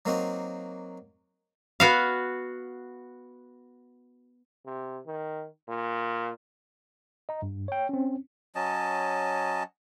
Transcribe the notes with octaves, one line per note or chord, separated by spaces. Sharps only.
F#3 A#3 C4 D#4 F#4
B3 F#4 F5
C3
D#3
A#2
D#5 A#5
G2
C#5 G5
C4 C#4
F#3 C#4 D#5 A5